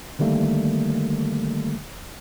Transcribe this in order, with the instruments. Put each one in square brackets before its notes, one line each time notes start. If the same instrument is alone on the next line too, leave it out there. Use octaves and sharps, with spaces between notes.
[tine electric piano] D3 D#3 G3 A3 A#3